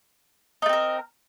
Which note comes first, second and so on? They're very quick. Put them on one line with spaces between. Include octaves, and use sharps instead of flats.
D#4 A3 C4 A#4